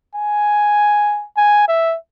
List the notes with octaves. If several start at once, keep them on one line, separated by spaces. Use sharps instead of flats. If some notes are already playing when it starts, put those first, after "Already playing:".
G#5
G#5
E5